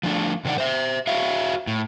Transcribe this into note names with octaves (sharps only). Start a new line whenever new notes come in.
F3 A3 D4
C3 D#3 C5 D5 F#5
C5 E5
F#4 C#5 E5 F5
A2